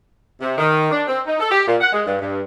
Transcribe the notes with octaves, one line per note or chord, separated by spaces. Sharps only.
C3
D#3
D4
C4
D#4
A4
G4
A#2
F#5
G#3
G2
G2